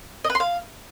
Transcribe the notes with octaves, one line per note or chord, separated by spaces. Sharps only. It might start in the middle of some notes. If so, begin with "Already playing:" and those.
D#5
B4
C6
F5